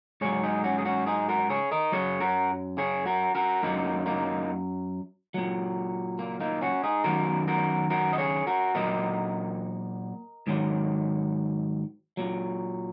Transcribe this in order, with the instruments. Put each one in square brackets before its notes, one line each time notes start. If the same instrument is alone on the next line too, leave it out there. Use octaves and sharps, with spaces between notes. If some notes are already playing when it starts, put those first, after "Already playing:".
[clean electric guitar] G#2 F#3 G#4 C#5
D#4 G#4
C#4 F#4
G#4
C#4 F#4
D#4 G#4
F#4 A#4
G#4 C#5
A#4 D#5
F#2 F#3 G#4 C#5
F#4 A#4
G#4 C#5
F#4 A#4
F#4 A#4
F#2 F#3 A#3 D#4
A#3 D#4
A#2 F#3
A#3
A#3 D#4
C#4 F#4
D#4 G#4
F#2 D#3 F#3 F#4 A#4
F#4 A#4
F#4 A#4
D#5
G#4 C#5
F#4 A#4
A#2 F#3 A#4 D#5
G#2 D#3 F#3
A#2 F#3